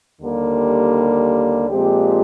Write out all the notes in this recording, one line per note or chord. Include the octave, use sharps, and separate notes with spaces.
D#2 D3 G3 A#3
A#2 F3 G#3 C4 G4